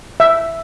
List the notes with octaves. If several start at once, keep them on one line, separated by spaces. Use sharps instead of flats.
E5